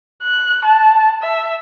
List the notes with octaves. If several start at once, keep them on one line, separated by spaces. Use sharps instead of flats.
F#6
A5
E5